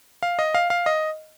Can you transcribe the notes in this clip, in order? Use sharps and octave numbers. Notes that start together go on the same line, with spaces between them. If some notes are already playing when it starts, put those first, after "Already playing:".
F5
D#5
F5
F5
D#5